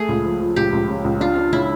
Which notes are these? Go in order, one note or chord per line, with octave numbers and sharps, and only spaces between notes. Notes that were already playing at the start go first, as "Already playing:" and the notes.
Already playing: A3 G#4
C#2
F3
F3
C#2 G4
C#2
C#3
C#2
D4 F4
D4
C#3 E4